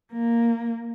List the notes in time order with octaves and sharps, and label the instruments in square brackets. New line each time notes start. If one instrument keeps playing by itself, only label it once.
[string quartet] A#3